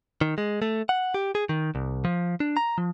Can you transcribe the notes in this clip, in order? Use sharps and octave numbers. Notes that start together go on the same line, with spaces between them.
D#3
G#3
A3
F#5
G4
G#4
D#3
C2
F3
D4
A#5
F3